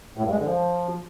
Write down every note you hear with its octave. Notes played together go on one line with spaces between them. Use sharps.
A2
G2
G#3
D3
F3